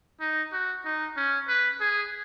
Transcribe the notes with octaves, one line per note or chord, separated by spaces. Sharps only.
D#4
F#4
D#4
C#4
B4
G#4